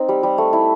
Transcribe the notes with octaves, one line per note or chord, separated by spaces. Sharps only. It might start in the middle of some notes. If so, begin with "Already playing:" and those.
Already playing: C4 D#4
G3
G3
A3
E4